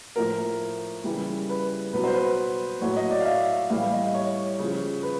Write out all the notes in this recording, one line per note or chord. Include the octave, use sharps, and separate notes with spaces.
A2 F3 A#4
C#3 E3 G3
B4
B2 F#3 B4
C5
B4
A2 F#3 C#5
D#5
D5
F5
E5
A2 E3 G3 F5
D#5
C#5
C#3 F3
B4